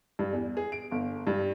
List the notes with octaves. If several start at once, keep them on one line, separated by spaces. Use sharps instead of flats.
G2
E2
G#4
D7
G1
G2